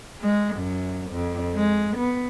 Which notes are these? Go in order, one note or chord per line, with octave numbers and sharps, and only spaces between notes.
G#3
F#2
F2
G#3
B3